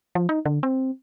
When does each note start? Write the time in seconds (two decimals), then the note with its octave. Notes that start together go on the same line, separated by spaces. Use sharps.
0.15 F3
0.29 D#4
0.46 D3
0.63 C4